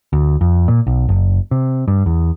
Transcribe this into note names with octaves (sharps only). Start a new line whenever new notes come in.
D2
F2
A#2
B1
F#1
C3
G2
E2